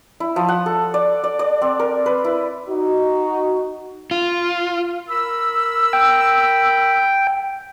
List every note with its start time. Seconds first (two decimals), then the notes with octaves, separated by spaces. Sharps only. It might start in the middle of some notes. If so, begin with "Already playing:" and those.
0.20 E4
0.36 F3
0.48 F#5
0.66 A4
0.94 D5
1.24 D5
1.39 D5
1.62 C4
1.79 A#4
2.06 B4
2.24 E4
2.68 D#4 F#4
4.11 F4
5.09 A#4 B5 E6
5.93 G5